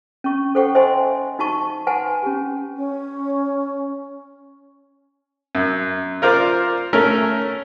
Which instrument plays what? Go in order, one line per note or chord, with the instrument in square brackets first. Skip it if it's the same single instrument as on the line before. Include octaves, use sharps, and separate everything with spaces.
[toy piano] C#4 C#6
A4 C5 F#5 G5 C#6
C5 D#5 E5 F#5 G#5 C6
D#4 F#4 A5 C#6
B4 F#5 G#5 A5 C6
C#4 G4
[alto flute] C#4
[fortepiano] F#2
F4 A#4 C5 D5
A3 C#4 A#4